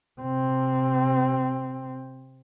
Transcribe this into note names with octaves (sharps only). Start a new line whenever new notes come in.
C3 C4